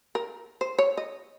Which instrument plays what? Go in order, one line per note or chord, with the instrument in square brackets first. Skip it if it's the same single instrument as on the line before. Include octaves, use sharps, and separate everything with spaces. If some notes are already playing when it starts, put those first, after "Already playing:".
[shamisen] A#4
C5
C#5
D#5